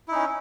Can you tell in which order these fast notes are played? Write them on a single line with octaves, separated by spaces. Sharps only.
E4 D#4 C#4